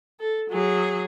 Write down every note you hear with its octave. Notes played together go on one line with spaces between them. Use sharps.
A4
F#3 G#4